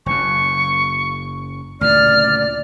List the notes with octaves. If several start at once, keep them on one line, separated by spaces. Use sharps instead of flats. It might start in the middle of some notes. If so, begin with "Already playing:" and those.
F#1 F#2 C#6
D2 A#2 C#3 D5 F6